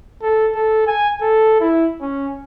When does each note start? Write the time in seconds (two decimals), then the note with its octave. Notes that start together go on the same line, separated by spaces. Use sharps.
0.22 A4
0.55 A4
0.87 G#5
1.21 A4
1.61 E4
2.01 C#4